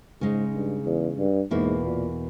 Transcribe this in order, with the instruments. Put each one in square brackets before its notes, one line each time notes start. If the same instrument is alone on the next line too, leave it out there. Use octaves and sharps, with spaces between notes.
[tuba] G#2 [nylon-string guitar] C#3 G#3 D#4
[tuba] G2
E2
G2
[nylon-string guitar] E2 B2 A#3 E4 [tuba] G#2
[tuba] A#2